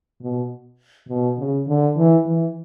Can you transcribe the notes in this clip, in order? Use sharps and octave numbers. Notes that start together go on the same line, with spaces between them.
B2
B2
C#3
D3
E3
E3